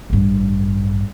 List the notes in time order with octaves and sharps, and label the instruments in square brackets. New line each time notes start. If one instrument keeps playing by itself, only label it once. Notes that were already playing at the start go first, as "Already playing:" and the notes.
[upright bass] A1 G2